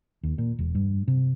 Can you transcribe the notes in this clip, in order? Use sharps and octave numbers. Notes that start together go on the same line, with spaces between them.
D#2
A#2
E1
G2
C3